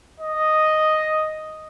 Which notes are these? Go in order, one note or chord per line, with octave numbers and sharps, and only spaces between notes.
D#5